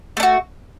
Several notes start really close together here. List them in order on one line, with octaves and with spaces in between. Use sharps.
A3 D4 F#4